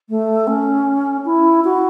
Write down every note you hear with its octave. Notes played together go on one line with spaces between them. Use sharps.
A3
C#4
E4
F#4